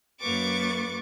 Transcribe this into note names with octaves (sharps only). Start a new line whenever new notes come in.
F#2 A#3 B4 C#6 D6 A6